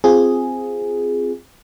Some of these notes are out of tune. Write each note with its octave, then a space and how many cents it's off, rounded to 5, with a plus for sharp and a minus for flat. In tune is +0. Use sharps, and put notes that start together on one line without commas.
C4 +0 F4 +0 G#4 +0